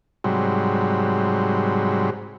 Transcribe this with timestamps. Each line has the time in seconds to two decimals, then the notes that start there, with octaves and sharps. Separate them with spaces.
0.24 G#2 C3 F#3 G3